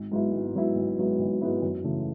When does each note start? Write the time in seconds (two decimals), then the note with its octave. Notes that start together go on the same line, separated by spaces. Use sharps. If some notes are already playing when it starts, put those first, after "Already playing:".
Already playing: G#1
0.11 G#2 F#3 B3 E4
0.33 G#1
0.55 G#2 F#3 B3 E4
0.76 G#1
0.98 G#2 F#3 B3 E4
1.19 G#1
1.41 G#2 F#3 B3 E4
1.62 F#2
1.84 C#3 E3 A3